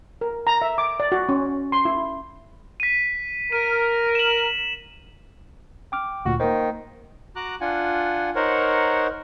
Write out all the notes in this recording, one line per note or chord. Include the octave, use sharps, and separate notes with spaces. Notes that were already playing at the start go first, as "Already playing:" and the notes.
A#4
A#5
E5
D6
D5
F#4
C#4
C6
E4
B6 D#7
A#4 D#7
E7 F#7
G5 D6 F6
D2 A#2 F#4
D#3 A#3 C5
F#4 A#5 D6 F#6
D4 F4 F#5 G#5
D#4 A#4 C5 C#5 F#5